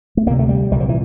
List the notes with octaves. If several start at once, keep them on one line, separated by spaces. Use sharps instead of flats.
A3
D2 C3 A#3
A3
G3
C2 A#2 F3 G3
E3